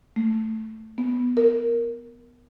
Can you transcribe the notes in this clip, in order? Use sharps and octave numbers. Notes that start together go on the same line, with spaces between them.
A3
B3
A#4